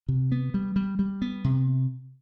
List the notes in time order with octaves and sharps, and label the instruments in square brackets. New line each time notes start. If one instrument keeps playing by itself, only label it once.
[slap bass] C3
B3
G3
G3
G3
B3
C3